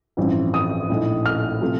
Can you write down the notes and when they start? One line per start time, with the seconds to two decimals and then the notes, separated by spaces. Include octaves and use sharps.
0.17 A1 G2 F3 C4
0.54 D#6
0.89 A#1 A2 A3 D#4
1.26 F6
1.61 C3 F3 A3